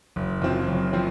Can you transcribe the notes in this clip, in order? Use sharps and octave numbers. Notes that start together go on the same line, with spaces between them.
F#1
F#2 F3 C4
F#1
F3 C4